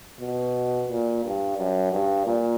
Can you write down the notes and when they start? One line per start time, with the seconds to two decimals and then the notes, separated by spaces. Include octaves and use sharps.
0.20 B2
0.89 A#2
1.24 G2
1.58 F#2
1.92 G2
2.26 A#2